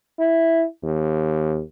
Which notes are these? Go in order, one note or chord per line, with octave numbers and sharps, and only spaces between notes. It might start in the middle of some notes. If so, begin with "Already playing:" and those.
E4
D#2